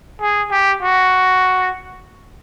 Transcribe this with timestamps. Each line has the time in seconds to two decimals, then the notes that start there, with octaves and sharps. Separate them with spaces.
0.21 G#4
0.51 G4
0.82 F#4